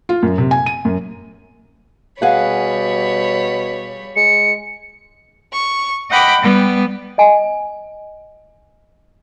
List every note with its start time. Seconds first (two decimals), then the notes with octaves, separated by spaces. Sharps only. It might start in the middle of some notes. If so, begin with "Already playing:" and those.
0.09 F4
0.23 F#2
0.38 C3
0.51 G#5
0.66 D#7
0.85 F#2
2.22 B2 G3 G#4 C#5 F5 F#5 B5
4.16 G#3 C#7
5.53 C#6
6.10 D#5 F#5 G5 B5 D6
6.41 G3 B3
7.18 D#5 G#5